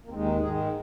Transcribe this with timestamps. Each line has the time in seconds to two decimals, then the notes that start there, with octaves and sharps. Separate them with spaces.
0.05 A#3
0.09 D#2 D#3 G#3 C4
0.25 D#4
0.40 G#2 D#3 G#3 G#4